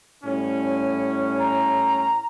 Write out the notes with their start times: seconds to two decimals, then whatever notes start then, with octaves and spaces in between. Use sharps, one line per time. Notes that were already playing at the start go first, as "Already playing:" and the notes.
0.24 A2 G3 C#4
1.39 A#5